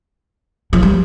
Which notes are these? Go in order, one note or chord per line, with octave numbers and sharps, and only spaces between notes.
F3
G3